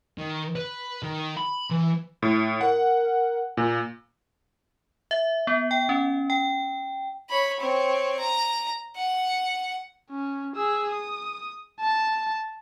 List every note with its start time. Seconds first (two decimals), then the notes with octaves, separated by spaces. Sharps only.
0.18 D#3
0.56 B4
1.03 D#3
1.37 B5
1.71 E3
2.22 A2
2.61 A#4 F#5
3.57 A#2
5.11 E5
5.47 B3
5.71 G5
5.89 C#4
6.30 G5
7.30 C#5 B5
7.60 C4 C#5
8.19 A#5
8.96 F#5
10.10 C#4
10.56 G#4 E6
10.90 D#6
11.80 A5